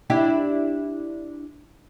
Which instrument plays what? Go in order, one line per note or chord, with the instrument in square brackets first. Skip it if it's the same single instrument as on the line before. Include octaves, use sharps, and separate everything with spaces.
[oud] D4 E4 G4